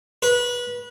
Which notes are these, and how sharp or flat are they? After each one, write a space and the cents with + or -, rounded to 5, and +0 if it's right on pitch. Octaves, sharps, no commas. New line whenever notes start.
B4 -25